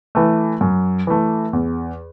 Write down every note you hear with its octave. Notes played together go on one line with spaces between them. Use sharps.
E3 A3
F#2
E3 A3
E2